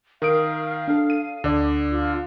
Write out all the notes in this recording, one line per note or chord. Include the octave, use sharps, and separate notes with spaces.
D#3 A#4 F5 D#6 D7
D4 A4
D#7
D2 D3 D5
F4